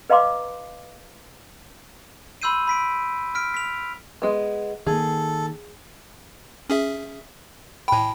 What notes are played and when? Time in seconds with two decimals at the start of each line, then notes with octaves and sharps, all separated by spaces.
0.10 B4 D#5 F5 A#5 C6 D6
2.42 B5 C6 E6 G6 C7 D#7
2.67 B5 B6 D7
3.35 F6 B6 D7
3.54 B6 F7
4.22 G#3 B3
4.87 D#3 A#3 G#4 A4
6.70 C#4 G#4 E5
7.88 A2 G5 A5 B5